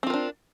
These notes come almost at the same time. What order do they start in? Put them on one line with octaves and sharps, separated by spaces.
C4 F4 A#4 D4